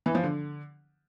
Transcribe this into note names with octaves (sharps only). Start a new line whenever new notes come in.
E3
F3
D3